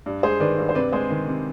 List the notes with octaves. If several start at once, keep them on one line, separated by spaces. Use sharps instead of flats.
G2
G#3 G#4 C5
D#3 B4 D5
G2
C5
C3 B4 D5
G#3 G#4 C5
D#3
C3